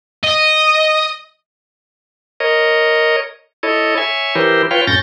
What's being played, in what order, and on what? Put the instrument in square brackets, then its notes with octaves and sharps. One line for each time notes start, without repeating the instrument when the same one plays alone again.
[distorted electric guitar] D#5
[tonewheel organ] A#4 C#5 D#5
E4 A4 C#5 D#5
C#5 E5 G#5
E3 E4 G4 A#4 C5
F4 B4 C#5 F5 G5
F#2 A2 C#4 G6 A6 A#6